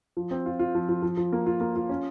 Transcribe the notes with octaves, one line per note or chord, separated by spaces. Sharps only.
F3
C4
F4
F4
F3
F3
F3
F3
A#3
F4
A#3
F4
C#4